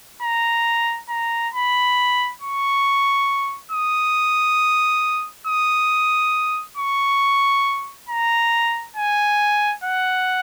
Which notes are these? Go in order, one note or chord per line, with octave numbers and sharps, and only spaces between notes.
A#5
A#5
B5
C#6
D#6
D#6
C#6
A#5
G#5
F#5